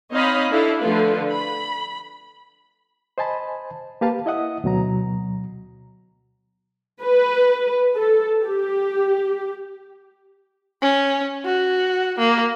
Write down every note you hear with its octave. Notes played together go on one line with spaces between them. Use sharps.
C4 D#4 C#5 D#5 F5 B5
D4 E4 A4 F5
D3 F3 A3 F4 B4
B5
C5 D#5 G#5 A5 B5
A#3 G4 B4 F5 A5
E4 D#5 E5 F#5 D#6
D2 B2 F#3 A#5
B4
A4
G4
C#4
F#4
A#3